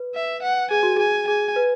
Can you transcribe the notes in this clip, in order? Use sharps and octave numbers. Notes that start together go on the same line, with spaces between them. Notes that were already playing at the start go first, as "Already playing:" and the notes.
Already playing: B4
E5
F#5
G#4 G#5
F#4
G#4 G#5
G#4 G#5
B4